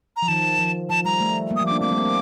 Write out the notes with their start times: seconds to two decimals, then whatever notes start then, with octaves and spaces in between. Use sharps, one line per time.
0.16 A#5
0.22 F3
0.28 D#3 A5
0.59 F3
0.90 F3 A5
1.05 G3 A#5
1.20 A3
1.51 G3 A#3
1.56 D#6
1.61 F3
1.66 D6
1.71 A#3 D4
1.81 A3 C4 D6
1.92 G3 A#3
2.02 A3 C4